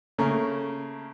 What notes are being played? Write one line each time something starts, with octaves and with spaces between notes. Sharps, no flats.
C#3 A3 A#3 A#4